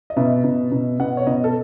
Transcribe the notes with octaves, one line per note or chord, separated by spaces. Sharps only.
D#5
B2 E5
B2
B2
B2 F#5
C#5
B2 D#5
A4